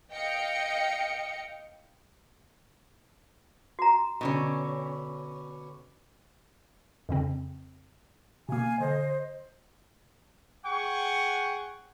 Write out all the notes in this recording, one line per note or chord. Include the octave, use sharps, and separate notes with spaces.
D#5 F5 G5 C#7
F#4 A#5
B2 D3 C#4
F2 C#3 C4
B2 A#3 F5 G#5
D3 C5 D#5
G#4 F#5 G5 C#6